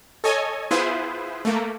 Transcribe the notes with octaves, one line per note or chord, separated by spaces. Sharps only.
A4 C#5 D#5 G#5
B3 E4 F4 G#4 B4 C5
A3 A#3